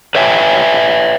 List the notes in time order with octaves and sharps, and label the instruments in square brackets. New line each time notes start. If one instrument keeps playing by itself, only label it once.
[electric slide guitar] B4 C#5 E5 G5 G#5